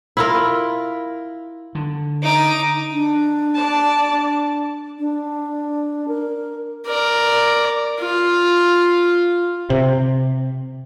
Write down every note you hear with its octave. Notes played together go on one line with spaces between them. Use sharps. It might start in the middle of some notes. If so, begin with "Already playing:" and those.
E4 F4 A#4
D3
D#4 D6
D4
D5 A5
D4
A#4
A#4 D5
F4
C3